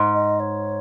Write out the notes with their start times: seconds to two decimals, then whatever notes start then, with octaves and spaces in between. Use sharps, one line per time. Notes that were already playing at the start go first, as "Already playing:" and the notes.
Already playing: G#2
0.14 D#5
0.39 C#5